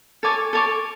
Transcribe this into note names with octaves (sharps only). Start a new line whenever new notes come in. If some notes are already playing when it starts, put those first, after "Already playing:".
A4 C#5 G#5 D6
A4 C#5 G#5 D6